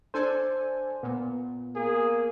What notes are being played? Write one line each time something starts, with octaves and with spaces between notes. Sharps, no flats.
D4 A4 C5 G#5
A#2 B3
A#3 G#4